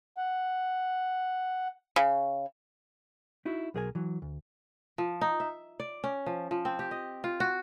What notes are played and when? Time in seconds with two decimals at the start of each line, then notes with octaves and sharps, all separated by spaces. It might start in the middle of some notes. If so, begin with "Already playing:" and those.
0.17 F#5
1.96 C#3
3.45 D#4 E4 F#4
3.74 B1 F#3 G#4 A#4 D5 G#5
3.95 E3 F#3
4.22 D2
4.98 F3
5.21 D#4
5.40 E5
5.80 D5
6.04 C#4
6.26 F3
6.51 F3
6.65 C4
6.79 G4
6.91 D#5
7.24 F4
7.40 F#4